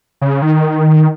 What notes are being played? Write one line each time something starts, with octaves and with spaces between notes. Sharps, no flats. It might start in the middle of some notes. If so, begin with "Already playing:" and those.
C#3
D#3